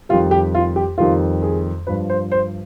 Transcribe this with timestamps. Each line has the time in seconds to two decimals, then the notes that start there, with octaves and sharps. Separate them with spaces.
0.09 F2 D#3 G3 F4
0.31 G4
0.55 F4
0.76 G4
0.98 F2 D#3 G3 F4
1.43 G#4
1.87 G2 F3 B4
2.10 C5
2.32 C5